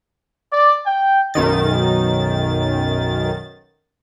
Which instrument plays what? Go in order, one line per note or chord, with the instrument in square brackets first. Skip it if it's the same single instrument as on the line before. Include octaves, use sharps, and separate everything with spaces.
[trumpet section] D5
G5
[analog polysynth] B1 F#2 D#3 A6